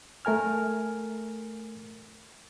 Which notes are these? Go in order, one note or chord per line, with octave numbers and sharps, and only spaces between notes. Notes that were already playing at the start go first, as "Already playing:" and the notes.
A3 A#4 G#5 F6